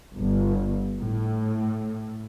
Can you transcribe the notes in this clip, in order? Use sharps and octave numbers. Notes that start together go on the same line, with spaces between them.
G1
A2